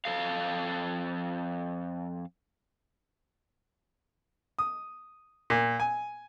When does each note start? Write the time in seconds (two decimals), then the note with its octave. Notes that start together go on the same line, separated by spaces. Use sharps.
0.05 F2 G3 A4 F5
4.59 D#6
5.50 A#2
5.80 G#5